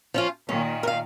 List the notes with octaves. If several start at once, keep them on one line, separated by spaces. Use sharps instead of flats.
F3 C#4 F4
A#2 D#3 C#4
A#4
F5